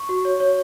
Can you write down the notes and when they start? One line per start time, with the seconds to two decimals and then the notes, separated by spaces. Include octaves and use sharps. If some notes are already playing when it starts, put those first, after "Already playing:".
Already playing: C#6
0.09 F#4
0.25 C#5
0.40 C#5